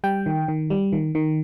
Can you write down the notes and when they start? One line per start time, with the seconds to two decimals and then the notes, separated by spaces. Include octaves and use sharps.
0.04 G3 G5
0.26 D#3
0.48 D#3
0.70 G3
0.92 D#3
1.15 D#3